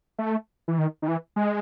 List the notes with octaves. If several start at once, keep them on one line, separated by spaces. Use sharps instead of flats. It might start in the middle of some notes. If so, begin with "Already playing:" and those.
A3
E3
D#3
D#3
E3
G#3